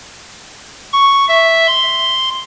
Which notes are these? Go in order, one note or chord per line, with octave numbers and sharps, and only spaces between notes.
C#6
E5
C6